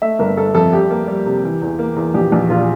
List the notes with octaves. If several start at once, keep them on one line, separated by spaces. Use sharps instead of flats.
A3 E5
G1 A#4
G1 A4
F2 A4
G3 G4
A#3
G3
C3
E3
E2
A#3
E2
A#1 G4
A#1
A#2 F4